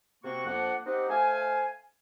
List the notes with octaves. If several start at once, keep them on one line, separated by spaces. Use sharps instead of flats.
C3 A#3 C4 F#4 C#6
F2 F3 A#3 D4 F#5
C4 D#4 G4 D#5 F#5
A3 C5 F5 G#5